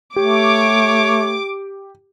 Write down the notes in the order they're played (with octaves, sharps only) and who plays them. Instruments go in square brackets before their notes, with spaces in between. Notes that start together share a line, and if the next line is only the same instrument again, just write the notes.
[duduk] A3 [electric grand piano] G4 [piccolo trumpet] C#5 [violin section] D6